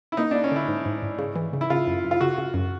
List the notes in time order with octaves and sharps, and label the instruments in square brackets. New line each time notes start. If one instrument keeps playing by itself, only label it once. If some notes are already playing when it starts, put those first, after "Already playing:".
[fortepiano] E4
[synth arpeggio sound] A#3 [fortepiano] D#4
[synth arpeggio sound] A#3 [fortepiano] D4
[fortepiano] C#4
[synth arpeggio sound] D3 [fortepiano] E4
[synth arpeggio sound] G#2
G#2
G#2
C#3
E3
C#3
[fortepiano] E4
[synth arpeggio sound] C#3 [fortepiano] F4
[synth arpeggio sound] F#2
F#2
[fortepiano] F4
[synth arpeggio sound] C#3 [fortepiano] F#4
[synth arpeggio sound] C#3
F#2